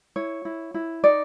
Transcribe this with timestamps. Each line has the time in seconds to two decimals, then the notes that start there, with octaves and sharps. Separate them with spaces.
0.16 E4 C#5
0.45 E4
0.74 E4
1.04 D#4 D5